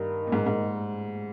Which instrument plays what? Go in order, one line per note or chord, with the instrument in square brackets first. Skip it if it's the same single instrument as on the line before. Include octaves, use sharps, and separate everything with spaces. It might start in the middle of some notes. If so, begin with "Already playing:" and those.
Already playing: [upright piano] G2 [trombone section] D#3 A#3 D#4
[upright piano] A#2
G#2
G#2